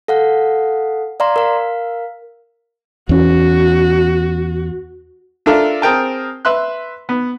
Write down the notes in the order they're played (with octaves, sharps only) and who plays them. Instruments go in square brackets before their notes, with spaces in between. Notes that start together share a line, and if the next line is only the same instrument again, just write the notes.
[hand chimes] A4 F5 F#5
D5 F5 A#5 C6
A#4 F5
[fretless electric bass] E2 C#4 [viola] F#4
[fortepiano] D4 F4 A4 A#4 D5 E5
C4 G#4 A#4 G5 A5
B4 E5 C6 F#6
B3